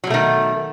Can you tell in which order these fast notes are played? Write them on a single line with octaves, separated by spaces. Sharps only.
F#3 B2 A3 D#3